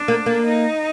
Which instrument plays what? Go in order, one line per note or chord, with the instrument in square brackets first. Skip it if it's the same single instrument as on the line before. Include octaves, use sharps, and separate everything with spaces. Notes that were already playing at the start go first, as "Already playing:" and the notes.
Already playing: [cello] D4
[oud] A#3
A#3
[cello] D#4